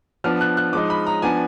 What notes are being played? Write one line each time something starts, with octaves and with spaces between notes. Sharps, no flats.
F3 B3 D4 F6
F#6
F#6
F3 G#3 D#4 D6
B5
A#5
F3 B3 D4 G#5